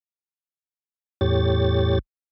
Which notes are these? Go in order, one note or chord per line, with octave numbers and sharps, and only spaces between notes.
E2 A2 G4 C#5 A6